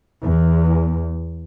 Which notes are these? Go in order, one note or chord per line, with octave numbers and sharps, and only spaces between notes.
E2